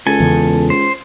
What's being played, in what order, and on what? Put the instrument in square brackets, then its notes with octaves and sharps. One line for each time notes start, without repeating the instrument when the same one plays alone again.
[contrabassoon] C#2 [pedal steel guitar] A4 G#5
[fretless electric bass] E2 C#3
[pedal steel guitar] C5